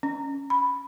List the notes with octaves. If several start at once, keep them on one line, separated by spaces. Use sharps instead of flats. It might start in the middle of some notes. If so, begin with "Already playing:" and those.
C#4
B5